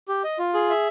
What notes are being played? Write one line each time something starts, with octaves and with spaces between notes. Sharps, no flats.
G4
D#5
F4
G#4
E5